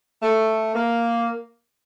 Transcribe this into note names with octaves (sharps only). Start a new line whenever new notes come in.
A3
A#3